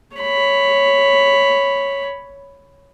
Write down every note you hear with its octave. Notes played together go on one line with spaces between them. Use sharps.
C#5 B5